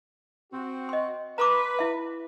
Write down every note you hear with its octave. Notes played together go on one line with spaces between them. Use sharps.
C4 F#4
D#5 C6
B4 A#5 C6 D6
E4 E5